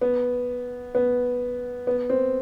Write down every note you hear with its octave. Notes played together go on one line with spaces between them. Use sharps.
B3
B3
B3
C4